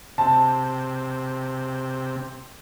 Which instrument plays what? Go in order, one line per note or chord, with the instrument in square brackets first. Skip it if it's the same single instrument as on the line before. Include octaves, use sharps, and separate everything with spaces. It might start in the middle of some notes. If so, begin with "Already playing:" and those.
[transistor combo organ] C3 [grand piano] A5